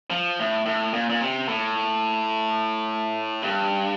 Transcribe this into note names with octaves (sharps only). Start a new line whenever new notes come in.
F3
A2
A2
A#2
A#2
C3
A2
G2